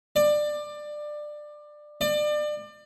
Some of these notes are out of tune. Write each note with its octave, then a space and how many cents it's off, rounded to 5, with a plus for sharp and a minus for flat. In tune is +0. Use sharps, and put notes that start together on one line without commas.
D5 +20
D5 +30